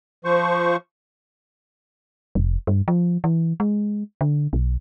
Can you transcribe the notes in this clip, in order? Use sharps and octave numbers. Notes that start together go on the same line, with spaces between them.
F3 C5 C#6
F1
G2
F3
E3
G#3
D3
B1